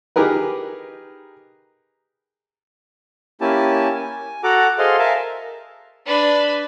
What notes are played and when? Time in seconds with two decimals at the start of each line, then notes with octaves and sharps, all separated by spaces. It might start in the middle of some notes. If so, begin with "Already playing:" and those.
0.16 D#4 G4 G#4 A#4 B4
3.41 A#3 C#4 E4 G4 G#5 A5
3.96 G#5
4.43 F#4 A4 F#5 A#5 D6
4.79 G#4 A4 C5 D#5 F5 C6
4.99 A#4 E5 F5 G#5 A5
6.06 D4 B4